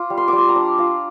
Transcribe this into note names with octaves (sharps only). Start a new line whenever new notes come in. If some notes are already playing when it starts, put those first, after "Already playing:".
Already playing: F4 D6
G3
C6
G3 D6
C6
A#5
D4
F4